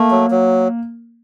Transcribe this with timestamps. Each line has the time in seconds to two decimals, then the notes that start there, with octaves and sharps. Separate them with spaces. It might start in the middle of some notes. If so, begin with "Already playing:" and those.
Already playing: A3 A#3
0.11 F#3
0.31 F#3